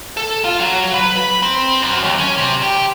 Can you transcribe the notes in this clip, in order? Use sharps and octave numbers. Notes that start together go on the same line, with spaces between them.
A4
F4
F#3
B4
B5
C4
F#2
D#2
C#4
C3
G4